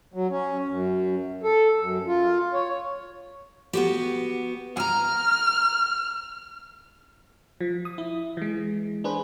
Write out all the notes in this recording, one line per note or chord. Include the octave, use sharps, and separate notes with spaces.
F#3
C#4
F#2
A4
F#2
F4
C#5
B3 F#4 G4
G#5 A#5 F6
F3
D#6
E4
E3 G#3
D4 G#4 B4 C5